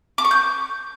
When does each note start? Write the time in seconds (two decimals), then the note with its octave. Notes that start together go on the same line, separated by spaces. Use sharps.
0.18 D6
0.25 C#6
0.31 G6